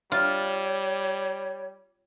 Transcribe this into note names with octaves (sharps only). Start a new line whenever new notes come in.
G3 F4 C#5